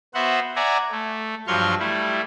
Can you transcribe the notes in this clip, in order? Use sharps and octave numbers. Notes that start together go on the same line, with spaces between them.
B3 F#4 C5 E5 F#5
D5 E5 F#5 G#5 A#5
A3
G2 F3 F#3 F5 C6 C#6
G3 A3 E4